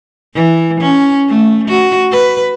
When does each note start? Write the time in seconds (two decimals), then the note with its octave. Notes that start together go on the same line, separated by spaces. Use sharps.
0.34 E3
0.80 C#4
1.29 A3
1.68 F#4
2.11 B4